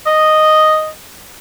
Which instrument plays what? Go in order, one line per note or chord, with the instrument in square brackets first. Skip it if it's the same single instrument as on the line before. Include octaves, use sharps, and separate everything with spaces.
[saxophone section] D#5